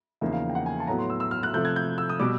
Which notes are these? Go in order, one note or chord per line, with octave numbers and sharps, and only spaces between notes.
E2 C#3 F3 A#3 D#4 E5
F5
G5
F#5
G#5
A5
A2 F#3 B3 A#5
C6
E6
E6
F6
F#6
C3 F3 A3 G6
G#6
G6
E6
D#6
B2 G3 D6